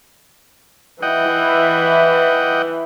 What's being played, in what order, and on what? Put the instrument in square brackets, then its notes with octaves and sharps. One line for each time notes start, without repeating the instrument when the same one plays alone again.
[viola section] E3 E4 [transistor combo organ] D#5 F#5 G5